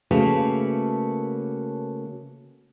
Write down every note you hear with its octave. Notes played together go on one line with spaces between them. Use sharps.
C#3 A3 A#3 F#4 B4